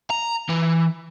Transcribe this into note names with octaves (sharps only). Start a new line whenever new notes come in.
A#5
E3